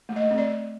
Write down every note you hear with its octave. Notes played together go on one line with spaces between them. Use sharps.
A3
D#5
A3
C4
D5